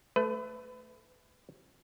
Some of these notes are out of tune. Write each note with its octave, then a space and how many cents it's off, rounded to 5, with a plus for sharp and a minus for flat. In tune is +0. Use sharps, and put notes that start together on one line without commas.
A3 +0 B4 +30